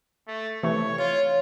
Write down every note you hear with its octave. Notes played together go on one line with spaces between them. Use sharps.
A3
C3 E3 A3 C#5
F4 C#5